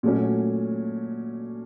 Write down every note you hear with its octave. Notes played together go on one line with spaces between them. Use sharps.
A#2 F#3 A3 C#4